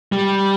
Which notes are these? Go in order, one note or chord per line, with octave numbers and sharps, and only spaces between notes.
G3